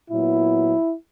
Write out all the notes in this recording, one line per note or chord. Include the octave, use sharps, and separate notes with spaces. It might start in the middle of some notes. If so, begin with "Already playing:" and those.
A#2 F#3 B3 E4